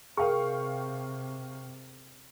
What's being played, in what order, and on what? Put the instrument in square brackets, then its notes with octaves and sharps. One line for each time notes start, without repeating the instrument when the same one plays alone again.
[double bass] C3 [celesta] G#4 A#4 [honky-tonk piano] F5 G5 C#6